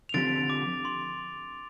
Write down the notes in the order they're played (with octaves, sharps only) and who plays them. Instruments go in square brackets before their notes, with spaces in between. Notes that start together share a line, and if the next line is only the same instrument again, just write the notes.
[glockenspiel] F7
[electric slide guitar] D3 F3 C4 G4 [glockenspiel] A6 D7
[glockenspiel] D6
C6